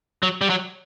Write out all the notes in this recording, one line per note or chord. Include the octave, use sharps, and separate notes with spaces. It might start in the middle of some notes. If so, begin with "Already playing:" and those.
F#3
G3
F#3